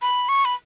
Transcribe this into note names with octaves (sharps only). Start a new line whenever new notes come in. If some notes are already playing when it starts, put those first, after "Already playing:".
B5
C#6
B5